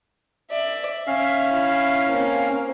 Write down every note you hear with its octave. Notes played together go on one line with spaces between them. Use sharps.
D5 E5
C#4 E5 F5
E4
A#3 C4